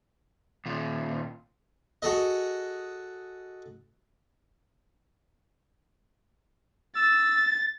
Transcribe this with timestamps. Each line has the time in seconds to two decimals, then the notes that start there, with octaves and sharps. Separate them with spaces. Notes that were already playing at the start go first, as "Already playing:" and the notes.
0.66 D#2 A#2
2.02 F#4 G#4 A4 D#5
6.96 E6 A6